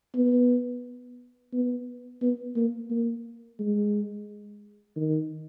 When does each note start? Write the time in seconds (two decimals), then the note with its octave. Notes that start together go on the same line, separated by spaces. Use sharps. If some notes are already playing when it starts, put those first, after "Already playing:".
0.15 B3
1.53 B3
2.22 B3
2.56 A#3
2.90 A#3
3.60 G#3
4.97 D#3